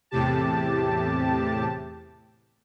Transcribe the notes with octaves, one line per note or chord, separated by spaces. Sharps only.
E2 A2 C3 G4 A5